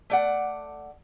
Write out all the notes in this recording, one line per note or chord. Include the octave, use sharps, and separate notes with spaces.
A3 D5 F#5